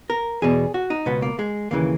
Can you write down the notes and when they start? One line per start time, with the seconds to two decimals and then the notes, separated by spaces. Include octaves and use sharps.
0.10 A#4
0.42 E2 B2 G#4
0.74 F#4
0.90 D#4
1.06 C#2 B2 B3
1.22 A#3
1.39 G#3
1.71 D#2 C#3 E3 A#3